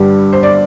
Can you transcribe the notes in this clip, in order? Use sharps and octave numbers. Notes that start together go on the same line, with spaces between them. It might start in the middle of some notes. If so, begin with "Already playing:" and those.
Already playing: G2 D3 G3
C5
D5